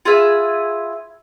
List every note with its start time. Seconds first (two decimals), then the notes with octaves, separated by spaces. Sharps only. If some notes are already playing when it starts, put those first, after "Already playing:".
0.05 F4 G#4 B4 E5